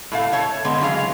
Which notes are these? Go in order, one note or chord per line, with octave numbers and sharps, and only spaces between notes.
A2 A3 F5
A4 C#5 A5
D3 G#3 B3
E3 F#3 G#4 F5